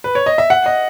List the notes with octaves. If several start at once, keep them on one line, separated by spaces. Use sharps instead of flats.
B4
C#5
D#5
E5
F#5
D#5